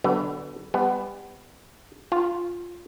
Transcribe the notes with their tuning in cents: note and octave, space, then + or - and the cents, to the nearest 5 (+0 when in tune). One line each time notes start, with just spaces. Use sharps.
D3 +0 F#3 +45 B3 +0
G3 +30 B3 +20
F4 +0 F5 +0